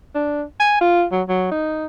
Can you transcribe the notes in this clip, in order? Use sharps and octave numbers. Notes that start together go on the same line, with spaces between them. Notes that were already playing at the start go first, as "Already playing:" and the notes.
D4
G#5
F4
F#3
F#3
D#4